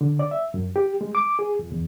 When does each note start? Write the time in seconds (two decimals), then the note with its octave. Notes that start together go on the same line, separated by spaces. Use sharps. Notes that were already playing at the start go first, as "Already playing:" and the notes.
0.01 D3
0.19 D5
0.31 E5
0.54 F#2
0.76 G4
1.01 G#3
1.15 D6
1.39 G#4
1.59 F2
1.72 E2